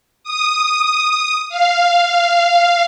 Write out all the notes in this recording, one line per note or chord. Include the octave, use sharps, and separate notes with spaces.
D#6
F5